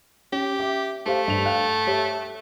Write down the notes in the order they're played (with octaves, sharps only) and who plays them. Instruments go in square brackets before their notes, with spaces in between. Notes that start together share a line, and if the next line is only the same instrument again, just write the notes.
[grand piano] C#4 [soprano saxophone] G4
[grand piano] E5 D6
[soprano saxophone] A3 [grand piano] G4 C5 F5
[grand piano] G2 F7
F5 G5 F#6
G4 C#5 E5